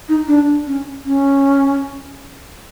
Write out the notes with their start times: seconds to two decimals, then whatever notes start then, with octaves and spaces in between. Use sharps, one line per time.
0.09 D#4
0.28 D4
0.67 C#4
1.05 C#4